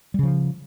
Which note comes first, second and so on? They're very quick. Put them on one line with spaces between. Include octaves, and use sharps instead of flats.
G3 C#3 F3